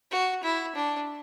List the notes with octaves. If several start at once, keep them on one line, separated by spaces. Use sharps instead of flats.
F#4
E4
D4